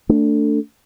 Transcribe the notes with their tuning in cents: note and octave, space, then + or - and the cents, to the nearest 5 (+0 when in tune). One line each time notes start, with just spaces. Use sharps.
A3 +20 D4 -10